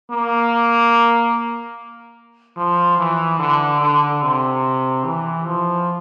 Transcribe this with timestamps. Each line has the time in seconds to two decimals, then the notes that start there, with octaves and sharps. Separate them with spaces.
0.10 A#3
2.57 F3
2.98 E3
3.39 D3
3.81 D3
4.22 C3
5.04 E3
5.46 F3